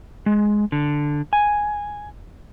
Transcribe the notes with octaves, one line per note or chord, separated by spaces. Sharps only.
G#3
D3
G#5